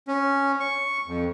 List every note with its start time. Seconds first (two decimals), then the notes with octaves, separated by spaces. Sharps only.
0.08 C#4
0.60 C#6
1.07 F2